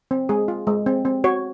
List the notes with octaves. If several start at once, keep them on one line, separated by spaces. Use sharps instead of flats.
C4
G#3 G#4
F4
G#3
C4
C4
F#4 C#5